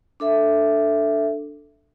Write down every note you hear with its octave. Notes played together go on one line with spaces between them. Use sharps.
D4 A4 E5